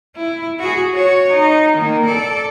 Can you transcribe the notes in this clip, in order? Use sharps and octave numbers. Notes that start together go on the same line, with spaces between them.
E4
F#4 G#4
F#4 C#5
D#4
D#3 A#3
A4 D5